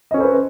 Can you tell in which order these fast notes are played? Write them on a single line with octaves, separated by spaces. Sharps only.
D#5 C#4 A4 C5 B4